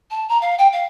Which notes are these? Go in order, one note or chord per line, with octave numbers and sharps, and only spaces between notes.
A5
A#5
F5
G5
F5